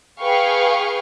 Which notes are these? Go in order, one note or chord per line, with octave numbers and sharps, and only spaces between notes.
G#4 B4 F5 G5 C#6